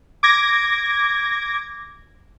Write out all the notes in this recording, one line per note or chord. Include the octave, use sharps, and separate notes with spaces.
D6 G#6 A#6